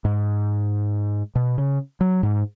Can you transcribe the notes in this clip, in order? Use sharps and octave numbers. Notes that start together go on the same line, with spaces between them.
G#2
B2
C#3
F#3
G#2